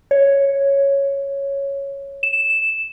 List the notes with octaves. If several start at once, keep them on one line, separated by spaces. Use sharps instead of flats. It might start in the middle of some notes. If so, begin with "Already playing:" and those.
C#5
E7